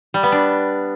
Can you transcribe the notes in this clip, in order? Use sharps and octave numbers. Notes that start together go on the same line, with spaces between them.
G3
B3
D4